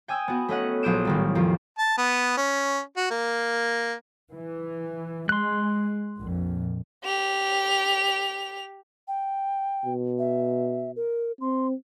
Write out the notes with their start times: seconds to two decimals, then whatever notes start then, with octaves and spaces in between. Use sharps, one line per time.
0.08 G5 G#5 D#6 E6
0.28 B3 F#4
0.48 A3 C#4 D#5 F#5
0.83 A#1 F#3 D#6 G6 D7 E7
1.05 A1 D#3 G3
1.35 F2 D#3 F3
1.79 A5
1.98 B3
2.37 C#4
2.97 F#4
3.11 A#3
4.34 E3
5.29 G#3 C6 F#6
6.20 A#1 F2
7.04 G4 F7
9.08 G5
9.85 B2
10.19 E5
10.96 A#4
11.41 C4 C6